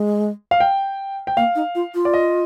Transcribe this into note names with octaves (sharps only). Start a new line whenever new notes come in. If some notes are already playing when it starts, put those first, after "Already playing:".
Already playing: G#3
F5
G5
G5
A#3 F5
D#4
F4
F4
D5
D#5